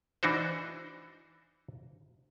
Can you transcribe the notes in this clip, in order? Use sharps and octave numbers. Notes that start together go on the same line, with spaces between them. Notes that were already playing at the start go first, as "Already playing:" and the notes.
E3 D4 D#4 F#4 C5